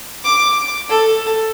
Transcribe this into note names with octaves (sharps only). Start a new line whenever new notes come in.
D6
A4